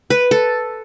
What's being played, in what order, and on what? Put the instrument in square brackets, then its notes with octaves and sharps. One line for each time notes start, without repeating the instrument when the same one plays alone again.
[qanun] B4
A4